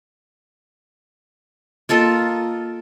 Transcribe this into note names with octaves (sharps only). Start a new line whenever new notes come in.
A#3 F4 A4 D#5